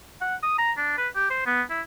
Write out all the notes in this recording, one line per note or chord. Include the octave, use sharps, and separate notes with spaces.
F#5
D#6
A#5
D4
B4
G4
C5
B3
E4